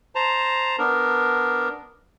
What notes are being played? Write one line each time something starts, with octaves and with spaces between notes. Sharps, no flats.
C5 A5 A#5
B3 D4 A#4